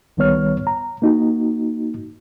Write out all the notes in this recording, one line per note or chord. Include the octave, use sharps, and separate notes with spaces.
C2 D#3 G3 B3 C#5 F6
A#5
A#3 D#4 F#4